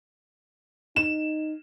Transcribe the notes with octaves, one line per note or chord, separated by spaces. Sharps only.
D#4 E7